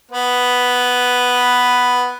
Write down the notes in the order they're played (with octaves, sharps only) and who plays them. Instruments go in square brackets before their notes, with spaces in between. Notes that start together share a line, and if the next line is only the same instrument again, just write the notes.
[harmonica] B3 [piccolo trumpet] B4